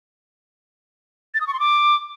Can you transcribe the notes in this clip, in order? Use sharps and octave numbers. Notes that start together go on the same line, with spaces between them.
A6
D#6
C#6
C6
D6